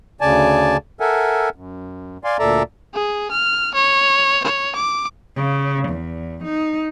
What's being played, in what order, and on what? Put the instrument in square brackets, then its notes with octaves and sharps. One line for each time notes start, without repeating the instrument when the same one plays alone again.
[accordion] D2 C#3 D5 G#5 A5
A4 A#4 E5 F#5 G#5
F#2
D5 F5 G#5 C6
D2 A#2 A4 D5 E5 A#5
[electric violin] G#4
F6
C#5
C#5
D6
[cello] C#3
E2
D#4